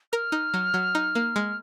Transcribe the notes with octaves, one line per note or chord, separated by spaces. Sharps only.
A#4 F6
D#4
F#3
F#3
D#4
A#3
G#3